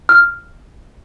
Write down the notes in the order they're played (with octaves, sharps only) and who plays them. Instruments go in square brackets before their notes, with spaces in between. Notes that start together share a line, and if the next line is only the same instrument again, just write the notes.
[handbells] F6